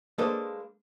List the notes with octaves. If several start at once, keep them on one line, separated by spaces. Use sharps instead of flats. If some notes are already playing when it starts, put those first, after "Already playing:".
G#3 A#3 D4 A4 B4 C5